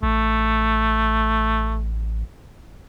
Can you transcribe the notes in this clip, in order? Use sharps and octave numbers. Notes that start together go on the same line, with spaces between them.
A1 A3